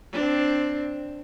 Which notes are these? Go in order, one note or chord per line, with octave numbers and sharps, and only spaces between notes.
C4 D4